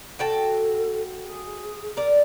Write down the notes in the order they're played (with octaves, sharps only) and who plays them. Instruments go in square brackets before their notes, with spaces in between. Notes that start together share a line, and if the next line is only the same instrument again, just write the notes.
[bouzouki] F#4 G5 A5 [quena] A4
[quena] G#4
[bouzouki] A#4 D5